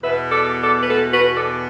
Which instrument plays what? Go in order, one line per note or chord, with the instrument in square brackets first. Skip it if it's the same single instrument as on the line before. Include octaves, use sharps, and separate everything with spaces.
[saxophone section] E2 B2 B3 B4 E5
A4 D5
A4 D5
B4
A4
F#4 B4
A4 D5